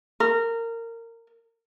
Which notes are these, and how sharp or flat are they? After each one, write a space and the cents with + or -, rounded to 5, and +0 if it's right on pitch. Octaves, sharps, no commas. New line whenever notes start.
A#4 -20